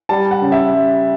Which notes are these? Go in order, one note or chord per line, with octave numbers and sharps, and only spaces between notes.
G3 A5
F#5
C#3
E5
G3